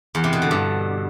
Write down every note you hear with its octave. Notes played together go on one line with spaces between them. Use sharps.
E2
C3
B2
D3
G2